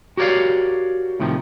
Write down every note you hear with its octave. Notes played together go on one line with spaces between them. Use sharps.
F#4 G4 A#4 C#5 D5 F5
A2 C3 D#3 F3